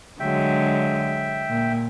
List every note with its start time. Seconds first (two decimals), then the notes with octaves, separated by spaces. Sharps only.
0.20 D3 F#3 G#3 E5 G5
1.49 A#2